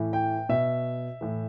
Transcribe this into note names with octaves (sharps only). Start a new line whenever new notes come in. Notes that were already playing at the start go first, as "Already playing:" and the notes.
Already playing: A2 E3
G5
B2 E5
A2 E3